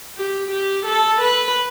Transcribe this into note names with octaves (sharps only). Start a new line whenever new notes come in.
G4
G4
A4
B4